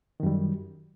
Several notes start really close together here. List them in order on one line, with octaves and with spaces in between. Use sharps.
D#3 F#2 G3